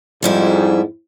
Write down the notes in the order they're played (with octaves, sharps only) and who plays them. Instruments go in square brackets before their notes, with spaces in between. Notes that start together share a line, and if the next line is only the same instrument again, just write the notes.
[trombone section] F2 G#2 [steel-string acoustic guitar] F3 G3 E4